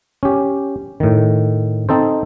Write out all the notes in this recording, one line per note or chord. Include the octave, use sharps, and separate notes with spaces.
C#4 G4
A2 D#3
C4 D#4 A4 C5